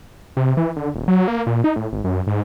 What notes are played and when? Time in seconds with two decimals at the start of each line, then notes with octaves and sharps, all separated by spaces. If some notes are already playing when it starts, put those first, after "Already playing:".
0.37 C3
0.57 E3
0.76 D3
0.94 D#1
1.08 F#3
1.28 A#3
1.47 A#2
1.64 D#4
1.76 A2
1.92 G#1
2.04 F#2
2.27 G#2